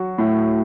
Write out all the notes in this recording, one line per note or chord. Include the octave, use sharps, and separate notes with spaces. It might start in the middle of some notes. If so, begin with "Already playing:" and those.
Already playing: F#3 F#4
A2